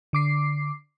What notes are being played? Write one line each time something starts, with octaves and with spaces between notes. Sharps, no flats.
D3 D6 C7